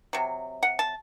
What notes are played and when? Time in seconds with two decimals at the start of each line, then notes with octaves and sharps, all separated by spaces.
0.13 C3 F#3
0.63 F#5
0.79 A5